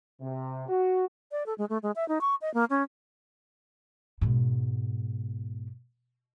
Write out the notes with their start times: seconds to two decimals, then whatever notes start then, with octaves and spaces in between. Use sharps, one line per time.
0.21 C3
0.69 F#4
1.32 D5
1.46 A4
1.58 G#3
1.70 A3
1.83 G#3
1.96 E5
2.08 D#4
2.21 C#6
2.42 D#5
2.54 A#3
2.70 C#4
4.21 G#2 B2